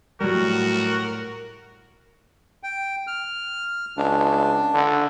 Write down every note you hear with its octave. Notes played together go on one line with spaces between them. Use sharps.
A2 F#3 G3 F#4 A#4
G5
F6
C#2 D4
D3